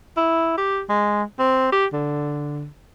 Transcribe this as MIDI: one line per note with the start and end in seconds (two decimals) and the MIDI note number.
0.17 0.54 64
0.57 0.82 67
0.89 1.23 56
1.39 1.69 60
1.72 1.86 67
1.93 2.68 50